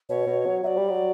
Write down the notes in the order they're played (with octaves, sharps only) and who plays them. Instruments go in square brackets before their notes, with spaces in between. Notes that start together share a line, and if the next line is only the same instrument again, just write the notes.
[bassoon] B2 [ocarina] C#5
[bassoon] B2
F#3
[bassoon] F#3 [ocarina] D5 E5
[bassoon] G3
F#3